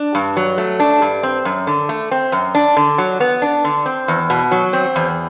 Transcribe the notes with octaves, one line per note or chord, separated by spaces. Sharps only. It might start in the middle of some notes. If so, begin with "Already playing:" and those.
Already playing: D4
G2
F#3
A3
D4
G2
C4
F#2
D3
A3
C4
F#2
D4
D3
F#3
B3
D4
D3
C4
E2
B2
F#3
C4
E2